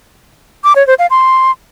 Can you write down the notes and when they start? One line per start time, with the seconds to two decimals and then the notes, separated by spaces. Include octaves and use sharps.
0.64 D6
0.76 C#5
0.87 C5
0.99 F5
1.10 C6